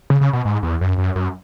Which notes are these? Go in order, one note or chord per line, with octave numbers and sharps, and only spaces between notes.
C#3
C#3
B2
G#2
E2
F#2
F#2
F#2